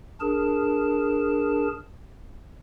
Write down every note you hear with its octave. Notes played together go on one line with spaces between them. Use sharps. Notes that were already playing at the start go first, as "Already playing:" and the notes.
D4 G#4 A#4 A5